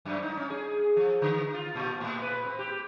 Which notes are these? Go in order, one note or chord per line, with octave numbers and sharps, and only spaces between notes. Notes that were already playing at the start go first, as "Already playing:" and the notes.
F#2
D#4
C#4
G#4
F3
D3
F4
A#2
A2
B4
C4
G4